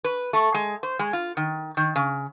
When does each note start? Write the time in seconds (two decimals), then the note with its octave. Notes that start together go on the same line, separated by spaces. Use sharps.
0.04 B4
0.33 A3
0.54 G#3
0.83 C5
0.99 G#3
1.13 F4
1.37 D#3
1.77 D#3
1.96 C#3